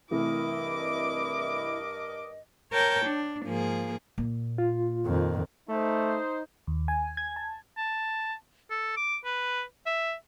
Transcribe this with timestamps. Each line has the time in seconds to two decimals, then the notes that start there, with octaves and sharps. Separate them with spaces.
0.11 G2 C3 E3 A3 E4 A#4 D#5 D6
2.71 A#4 C#5 G5 A5 G6
3.04 D4
3.43 G#2 F3 A#3 G#4
4.18 A#2
4.58 F4
5.06 F2 D#3
5.69 A3 D#4 C5
6.67 D#2
6.88 G#5
7.17 G#6
7.36 A5
7.77 A5
8.70 A4
8.97 D6
9.25 B4
9.86 E5